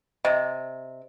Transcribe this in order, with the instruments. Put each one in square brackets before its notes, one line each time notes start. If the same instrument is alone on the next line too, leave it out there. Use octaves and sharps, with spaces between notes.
[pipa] C3 [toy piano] D#5